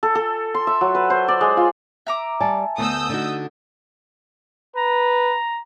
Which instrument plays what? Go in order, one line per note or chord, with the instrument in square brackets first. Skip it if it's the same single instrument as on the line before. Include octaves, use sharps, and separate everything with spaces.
[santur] A4
A4
C6
E5
F#3
B4
C5
D5
G#3
F4
[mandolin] E5 A#5 D6
[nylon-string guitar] G3 D5 [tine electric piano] G#5 A5
[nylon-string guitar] D2 B3 [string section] D#6 E6 G6
[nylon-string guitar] D3 D#4 F#4
[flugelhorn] B4 [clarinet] A#5